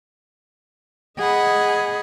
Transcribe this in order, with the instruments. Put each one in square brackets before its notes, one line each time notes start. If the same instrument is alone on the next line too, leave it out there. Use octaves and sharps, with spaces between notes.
[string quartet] G#4 D#5 F#5 B5